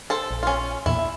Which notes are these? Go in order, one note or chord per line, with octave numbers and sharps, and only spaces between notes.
A4 C5
A#1
C#4 F4
E2 A#2 E4
E5